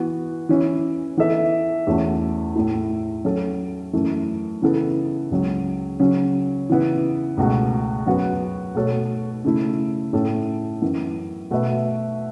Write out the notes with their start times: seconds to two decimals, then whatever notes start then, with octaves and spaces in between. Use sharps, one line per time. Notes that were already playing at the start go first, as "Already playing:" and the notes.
Already playing: E3 B3 F#4
0.49 E3 C#4 E4
1.17 E3 B3 A4 E5
1.87 E2 E3 A3 C#4 F#4
2.55 A2 A3 E4
3.25 F#3 C#4 A4
3.93 F#2 E3 A3
4.62 C#3 E3 B3 E4 A4
5.31 C#2 C#3 F#3
6.00 C#3 F#3 C#4
6.69 C#3 E3 B3 E4
7.37 C#2 B2 A3 F#4
8.06 F#2 F#3 B3 F#4 B4
8.75 B2 A3 F#4 A4 C#5
9.44 C#3 A3 E4
10.13 A2 A3 C#4 A4
10.82 F#2 E3 B3
11.50 B2 A3 F#4 B4 E5